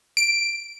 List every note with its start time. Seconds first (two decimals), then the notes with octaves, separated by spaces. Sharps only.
0.17 D7